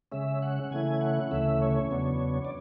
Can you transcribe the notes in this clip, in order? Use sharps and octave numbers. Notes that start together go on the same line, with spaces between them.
C#3 G#3 C#4 E5
F#5
C#3 E3 A3 C#4 E4 G#5
F#5
D2 C#3 E3 A3 C#4 E5
C#5
E2 C#3 F#3 B3 D4
D5